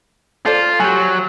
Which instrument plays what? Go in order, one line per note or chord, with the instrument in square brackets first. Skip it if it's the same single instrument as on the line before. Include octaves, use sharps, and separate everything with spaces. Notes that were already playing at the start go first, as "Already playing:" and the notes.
[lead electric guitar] F4 [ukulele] A4 C5 D5
[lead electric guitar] F#3 [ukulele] G4 G#5